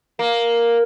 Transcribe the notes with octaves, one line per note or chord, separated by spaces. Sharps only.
A#3